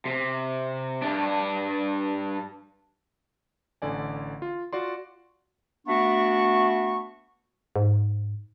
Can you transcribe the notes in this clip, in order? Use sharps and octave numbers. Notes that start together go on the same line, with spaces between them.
C3
G2 D4
A1 D3 D5 G#5
F4
F4 F#4 D5 C6
A3 B3 D4 F#4 E5 C#6
G#2